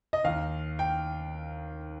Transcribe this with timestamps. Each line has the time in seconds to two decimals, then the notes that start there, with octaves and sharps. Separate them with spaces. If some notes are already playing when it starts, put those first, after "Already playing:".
0.13 D#5
0.24 D#2 D#3 F5
0.79 G5